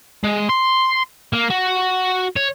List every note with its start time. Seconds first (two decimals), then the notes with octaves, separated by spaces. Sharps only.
0.24 G#3
0.49 C6
1.33 A#3
1.50 F#4
2.36 C#5